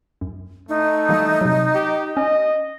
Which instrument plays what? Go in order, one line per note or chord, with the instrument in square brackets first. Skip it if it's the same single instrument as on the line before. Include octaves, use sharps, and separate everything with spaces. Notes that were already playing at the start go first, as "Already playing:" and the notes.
[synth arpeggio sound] F#2
[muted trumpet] A3 [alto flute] D#4
[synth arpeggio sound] E3 G3 A#3
C3 F#3
[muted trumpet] G4
[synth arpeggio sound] C#4 G#5 [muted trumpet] D#5